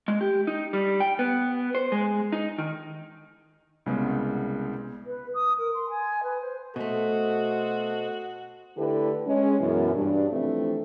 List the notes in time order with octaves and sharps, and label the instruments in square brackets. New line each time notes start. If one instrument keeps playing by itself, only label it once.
[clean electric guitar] G#3
G4
D#4
G3
G5
B3
C5
G#3
D#4
D#3
[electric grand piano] C2 C#3 G#3 B3
[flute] B4
D#6
A#4
C6
G#5
B4
C5
[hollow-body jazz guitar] B2 A3 [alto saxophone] F#4 [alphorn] A4 [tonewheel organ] C5 D#5
[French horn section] D3 A3 E4 G4 A4 B4
G#3 C#4
F#2 B2 E3
G2 D4
C3 E3 F3 A3 C4